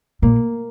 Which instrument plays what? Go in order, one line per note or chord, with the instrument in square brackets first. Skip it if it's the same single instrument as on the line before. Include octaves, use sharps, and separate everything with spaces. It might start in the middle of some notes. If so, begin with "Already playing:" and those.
[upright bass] A#2 [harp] A#3